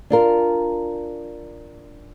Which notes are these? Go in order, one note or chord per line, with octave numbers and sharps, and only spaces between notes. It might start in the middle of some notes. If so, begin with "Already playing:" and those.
D4 F4 A#4